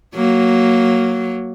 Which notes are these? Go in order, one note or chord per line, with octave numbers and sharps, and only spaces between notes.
F#3 A#3